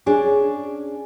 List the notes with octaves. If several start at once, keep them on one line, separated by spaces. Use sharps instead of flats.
C#4 D4 G#4